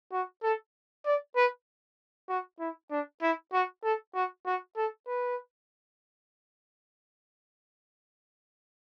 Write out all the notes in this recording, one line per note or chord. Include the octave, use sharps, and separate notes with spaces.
F#4
A4
D5
B4
F#4
E4
D4
E4
F#4
A4
F#4
F#4
A4
B4